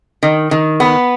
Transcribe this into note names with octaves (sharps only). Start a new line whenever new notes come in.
D#3
D#3
B3